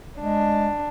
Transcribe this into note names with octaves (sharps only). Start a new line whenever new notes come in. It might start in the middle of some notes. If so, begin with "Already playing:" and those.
G#3 D4